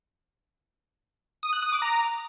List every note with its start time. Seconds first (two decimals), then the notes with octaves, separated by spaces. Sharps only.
1.43 D#6
1.53 F#6
1.62 D#6
1.72 D6
1.82 A#5